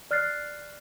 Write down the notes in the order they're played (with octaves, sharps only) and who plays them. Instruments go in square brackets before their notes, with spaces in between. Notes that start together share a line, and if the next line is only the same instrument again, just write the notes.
[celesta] D5 F6 F#6 A6 C7